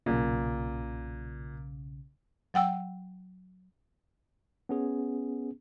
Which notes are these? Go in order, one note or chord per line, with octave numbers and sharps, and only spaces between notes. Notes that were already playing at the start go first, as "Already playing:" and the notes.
B1 A#2 C#3
F#3 F#5 G5 E6
B3 C#4 G#4